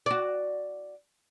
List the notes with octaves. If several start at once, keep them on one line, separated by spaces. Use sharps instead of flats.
F#4 D5